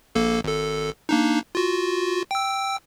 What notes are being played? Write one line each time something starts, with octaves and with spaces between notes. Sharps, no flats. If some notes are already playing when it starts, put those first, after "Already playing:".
A#1 A#3 A4
G#1 A4
A#3 D4 D#4
F4 F#4
G5 E6